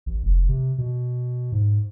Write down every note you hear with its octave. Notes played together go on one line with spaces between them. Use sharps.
A1
F1
C3
B2
G#2